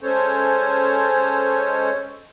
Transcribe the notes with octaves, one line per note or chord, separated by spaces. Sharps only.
G#3 C#4 A4 C5 C#5